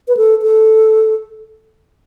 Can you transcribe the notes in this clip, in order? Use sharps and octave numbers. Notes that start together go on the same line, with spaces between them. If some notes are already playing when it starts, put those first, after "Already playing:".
B4
A4
A4